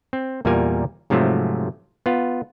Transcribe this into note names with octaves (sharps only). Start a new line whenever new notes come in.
C4
E2 A#2 G3 A#3 A#4 G#5
G#2 C3 F3 F#3 A3
B3 F4